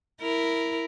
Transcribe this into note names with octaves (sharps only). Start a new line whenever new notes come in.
E4 A#4